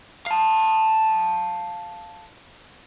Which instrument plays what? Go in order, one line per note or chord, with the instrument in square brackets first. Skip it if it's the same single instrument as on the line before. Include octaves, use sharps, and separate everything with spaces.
[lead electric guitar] F5 A5